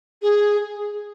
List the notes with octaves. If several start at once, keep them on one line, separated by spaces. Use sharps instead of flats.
G#4